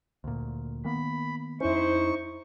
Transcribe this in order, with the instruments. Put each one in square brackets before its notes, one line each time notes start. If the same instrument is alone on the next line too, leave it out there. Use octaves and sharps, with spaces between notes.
[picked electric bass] D2 A#2
[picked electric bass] D#3 A#3 B3 [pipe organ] B5
[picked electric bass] F2 C#4 [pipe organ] D#4 C#6 [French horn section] E4 C5